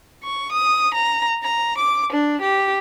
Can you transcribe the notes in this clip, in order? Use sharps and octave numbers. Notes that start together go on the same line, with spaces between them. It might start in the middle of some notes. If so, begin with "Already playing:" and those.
C#6
D#6
A#5
A#5
D6
D4
G4